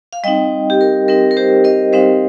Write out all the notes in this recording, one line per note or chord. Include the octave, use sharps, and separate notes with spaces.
F5
G3 C4 D#4 D#5 G5
G4
A#4
G3 C4 D#4 A#4
A#4
G4 C5
A#4 D#5
G3 C4 D#4 C5 F5